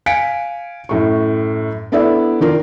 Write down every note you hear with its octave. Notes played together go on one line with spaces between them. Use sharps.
F5 G#5 B6 C#7 D7
F#2 A2 C#6
B3 D4 E4 A4 D5 E5
D#3 D4 F4 A#4 D5